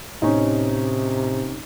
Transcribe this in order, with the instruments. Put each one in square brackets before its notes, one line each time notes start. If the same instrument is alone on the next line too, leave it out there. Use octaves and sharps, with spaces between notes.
[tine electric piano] A2 [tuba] C3 [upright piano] C#4 D#4